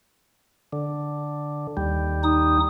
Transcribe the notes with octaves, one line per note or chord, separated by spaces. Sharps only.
D3
D#2 G3
D#4 D#6